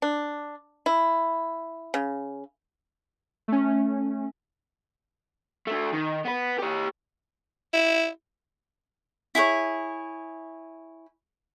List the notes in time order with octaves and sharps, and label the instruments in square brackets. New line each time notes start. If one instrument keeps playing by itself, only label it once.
[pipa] D4
E4
C#3
[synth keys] A3 C#4
[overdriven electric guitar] D3 A3
D#3
B3 B4
G4 C#5
[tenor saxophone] E4
[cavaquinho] E4 G#4 B4 C#5